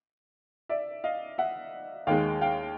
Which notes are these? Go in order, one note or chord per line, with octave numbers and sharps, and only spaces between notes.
D5 E5
D#5 F5
E5 F#5
D#2 D#3 G#3 F5 G5
F5 G5